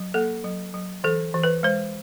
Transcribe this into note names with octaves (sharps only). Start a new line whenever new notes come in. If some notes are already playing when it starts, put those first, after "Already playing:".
Already playing: F#3
A#3 A4
F#3
F#3
E3 A4
E3
B4
G#3 C5